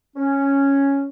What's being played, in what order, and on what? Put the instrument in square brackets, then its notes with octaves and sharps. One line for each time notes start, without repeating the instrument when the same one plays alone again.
[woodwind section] C#4